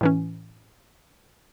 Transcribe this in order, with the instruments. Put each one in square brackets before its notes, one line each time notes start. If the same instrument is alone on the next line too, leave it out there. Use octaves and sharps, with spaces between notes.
[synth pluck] A2 E3 C#4